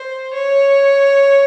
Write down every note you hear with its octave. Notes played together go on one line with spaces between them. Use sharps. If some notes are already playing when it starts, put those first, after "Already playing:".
Already playing: C5
C#5